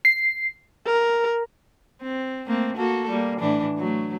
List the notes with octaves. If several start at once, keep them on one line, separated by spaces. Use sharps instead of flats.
C7
A#4
C4
A3 A#3 C4
A#3 F#4 A4
G3 A#3
A2 E3 D4
F#3 A3